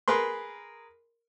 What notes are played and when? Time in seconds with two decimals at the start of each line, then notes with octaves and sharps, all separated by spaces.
0.08 G#4 A#4 B4 C6